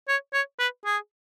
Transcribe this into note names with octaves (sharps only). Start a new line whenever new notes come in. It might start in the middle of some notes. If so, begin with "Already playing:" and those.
C#5
C#5
B4
G#4